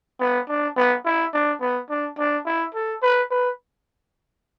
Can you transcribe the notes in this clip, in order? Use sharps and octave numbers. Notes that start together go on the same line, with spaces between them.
B3
D4
B3
E4
D4
B3
D4
D4
E4
A4
B4
B4